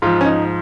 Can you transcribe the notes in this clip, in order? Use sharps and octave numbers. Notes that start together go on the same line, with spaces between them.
G#2 F3 F4
C#4
D#4